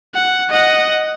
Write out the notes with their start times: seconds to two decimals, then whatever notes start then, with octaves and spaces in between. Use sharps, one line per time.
0.15 F#5
0.50 D#5 F#5